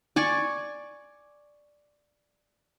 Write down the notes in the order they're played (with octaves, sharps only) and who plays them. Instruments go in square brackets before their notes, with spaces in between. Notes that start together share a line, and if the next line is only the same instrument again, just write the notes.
[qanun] D5 G#5 C#6